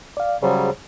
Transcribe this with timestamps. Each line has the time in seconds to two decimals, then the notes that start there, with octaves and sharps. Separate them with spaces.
0.17 D5 F5
0.42 C#3 F#3 G3 G#4 C5 C#5